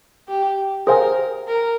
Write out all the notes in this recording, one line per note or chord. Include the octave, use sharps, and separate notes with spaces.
G4
G#4 A#4 C5 F5 G#5
A#4